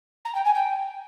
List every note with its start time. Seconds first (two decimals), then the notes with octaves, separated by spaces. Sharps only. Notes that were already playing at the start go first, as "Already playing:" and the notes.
0.25 A#5
0.34 G5
0.44 G#5
0.54 G5